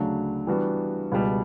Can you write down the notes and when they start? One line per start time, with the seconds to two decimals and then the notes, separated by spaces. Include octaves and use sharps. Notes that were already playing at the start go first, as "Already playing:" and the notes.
Already playing: D2 C#3 F#3 A3 D4
0.47 E3 G3 B3 D4 F#4
1.12 C#2 B2 G3